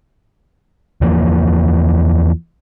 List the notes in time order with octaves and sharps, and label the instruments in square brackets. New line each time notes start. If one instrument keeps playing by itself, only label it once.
[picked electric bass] E2 E3 F3 A#3